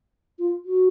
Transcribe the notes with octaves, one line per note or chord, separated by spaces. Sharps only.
F4
F#4